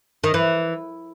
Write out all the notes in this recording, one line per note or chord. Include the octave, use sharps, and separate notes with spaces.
D#3
E3